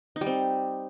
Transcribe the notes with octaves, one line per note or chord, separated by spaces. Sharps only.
D#4
G3
C4